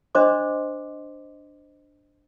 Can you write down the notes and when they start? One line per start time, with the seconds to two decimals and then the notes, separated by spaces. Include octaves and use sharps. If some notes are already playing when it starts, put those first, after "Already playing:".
0.15 D4 C5 D#5 C6 D6